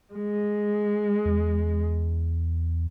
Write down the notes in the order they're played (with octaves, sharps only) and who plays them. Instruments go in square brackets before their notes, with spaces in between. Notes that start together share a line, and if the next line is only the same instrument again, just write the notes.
[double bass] G#3
[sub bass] E2